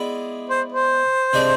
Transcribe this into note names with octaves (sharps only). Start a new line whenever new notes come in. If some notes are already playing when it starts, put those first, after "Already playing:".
Already playing: G#3 B3 E4 D5
C5
C5
C3 G#3 D4